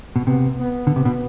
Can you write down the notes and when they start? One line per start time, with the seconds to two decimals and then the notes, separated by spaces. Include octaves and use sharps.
0.16 B2
0.27 C3 B3
0.59 B3
0.87 D3
0.96 C3
1.05 B2